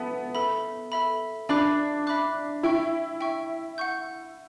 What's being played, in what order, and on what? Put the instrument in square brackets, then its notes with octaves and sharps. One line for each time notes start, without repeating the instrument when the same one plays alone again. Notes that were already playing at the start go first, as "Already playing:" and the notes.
Already playing: [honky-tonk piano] B3 [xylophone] A4 E5 A5
[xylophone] A4 E5 B5
A4 E5 B5
[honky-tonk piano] D4 [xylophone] E5 B5 D6 F#6
[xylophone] E5 B5 D6 F#6
[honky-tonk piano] E4 [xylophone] E5 G5 C#6
[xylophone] E5 G5 C#6
F#5 C#6 G6